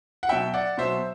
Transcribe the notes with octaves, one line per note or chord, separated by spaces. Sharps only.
F#5
B2 F#3 E5 G5
D5 F#5
B2 F#3 C5 E5